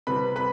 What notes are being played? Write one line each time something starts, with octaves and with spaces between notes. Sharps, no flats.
C3 G3 C4 B4 B5
B4 B5